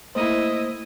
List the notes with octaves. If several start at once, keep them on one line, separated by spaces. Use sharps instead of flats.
A3 A#3 E4 C5 D#5